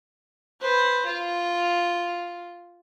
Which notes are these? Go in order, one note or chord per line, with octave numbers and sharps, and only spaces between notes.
B4 C5
F4